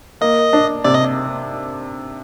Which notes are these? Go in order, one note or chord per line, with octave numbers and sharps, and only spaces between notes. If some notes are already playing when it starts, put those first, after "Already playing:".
A#3 D#5
D4
C3 D5
D#5